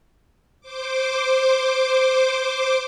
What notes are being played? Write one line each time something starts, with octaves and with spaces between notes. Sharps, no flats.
C5 D6